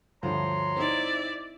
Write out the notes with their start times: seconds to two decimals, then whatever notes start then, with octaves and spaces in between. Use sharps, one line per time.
0.23 D2 G2 F3 C#5 A#5 C6
0.77 C4 D#4 E4 D5